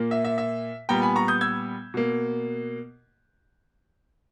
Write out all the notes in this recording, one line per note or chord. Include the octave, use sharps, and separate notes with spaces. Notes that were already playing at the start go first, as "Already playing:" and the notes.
Already playing: A#2 A#3
E5
E5
E5
A#2 G3 B3 G5 A#5
G#5 B5
A#5 C#6
D#6 G6
E6 G#6
B2 A#3